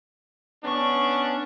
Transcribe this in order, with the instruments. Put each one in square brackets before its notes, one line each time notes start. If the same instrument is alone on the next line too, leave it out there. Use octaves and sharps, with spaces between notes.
[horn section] B3 C#4 D4 [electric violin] C#6